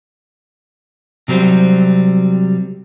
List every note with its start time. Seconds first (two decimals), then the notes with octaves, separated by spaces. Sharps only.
1.28 C3 F#3 G3 C4